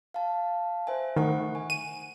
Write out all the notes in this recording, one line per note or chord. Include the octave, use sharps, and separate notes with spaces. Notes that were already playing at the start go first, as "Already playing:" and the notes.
F5 A5
C5 E5 G#5
D#3 A3 F#5 C#6
G#5
D#7